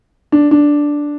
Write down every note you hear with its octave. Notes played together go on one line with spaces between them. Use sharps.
D4
D4